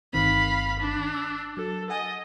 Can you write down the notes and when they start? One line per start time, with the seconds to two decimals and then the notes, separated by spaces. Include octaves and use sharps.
0.13 G1 D#3 C4 F5 B5
0.79 D4
1.14 E6
1.57 F#3 A4
1.90 D#5 F#5 G#5 A6